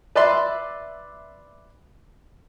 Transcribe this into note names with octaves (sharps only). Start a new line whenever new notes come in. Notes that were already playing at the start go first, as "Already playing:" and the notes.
B4 D5 E5 C6